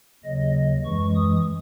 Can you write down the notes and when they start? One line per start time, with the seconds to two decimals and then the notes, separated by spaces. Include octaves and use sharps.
0.24 D#2 C#3 F#3 D#5
0.85 F#2 E3 G#3 C#6
1.16 D#6